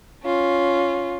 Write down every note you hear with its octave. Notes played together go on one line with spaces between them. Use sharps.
C#4 F4